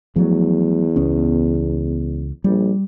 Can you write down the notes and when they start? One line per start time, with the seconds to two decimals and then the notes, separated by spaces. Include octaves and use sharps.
0.16 E2 F3 F#3 A3
0.96 C#2 B3 C#4
2.44 A#1 G3